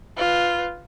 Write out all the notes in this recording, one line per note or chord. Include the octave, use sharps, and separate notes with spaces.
F4 B4